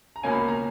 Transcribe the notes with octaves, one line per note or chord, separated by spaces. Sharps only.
A#5
C#2 B2 A#3 C#4 G#5
B5
A#5